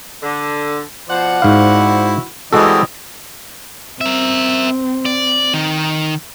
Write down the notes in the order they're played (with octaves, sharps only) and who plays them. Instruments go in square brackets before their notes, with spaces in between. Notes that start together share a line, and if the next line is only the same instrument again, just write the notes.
[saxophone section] D3
[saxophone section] B2 D5 F#5 [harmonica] F3 C5
[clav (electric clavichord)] G#2 F5 [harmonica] E4 F#4 C5
[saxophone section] B2 C4 [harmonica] E3 G3 D#5 [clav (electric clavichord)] G#3 F#4 A4
[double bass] C4 [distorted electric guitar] A#4 E5
[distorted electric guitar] D5
D#3 D#4